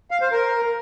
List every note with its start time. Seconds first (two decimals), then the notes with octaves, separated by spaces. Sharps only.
0.11 F5
0.21 C5
0.32 A#4